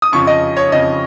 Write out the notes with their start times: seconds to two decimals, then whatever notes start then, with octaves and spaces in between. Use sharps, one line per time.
0.02 D#6
0.12 F2 C#3 F3 C#6
0.27 D#5
0.57 C#5
0.72 F2 C#3 F3 D#5